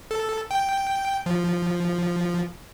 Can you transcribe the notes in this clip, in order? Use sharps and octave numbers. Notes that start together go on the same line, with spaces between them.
A4
G5
F3